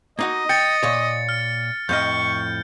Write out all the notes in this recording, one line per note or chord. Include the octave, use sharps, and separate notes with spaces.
A#3 D#4 F#4 D#5
G5 A6 C#7
A#2 C#5
F6
F2 A2 D#5 C#6 F6 G6